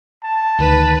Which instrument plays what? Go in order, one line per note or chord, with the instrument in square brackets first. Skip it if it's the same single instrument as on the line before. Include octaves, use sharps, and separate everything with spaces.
[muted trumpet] A5
[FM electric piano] D2 D#3 [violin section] B4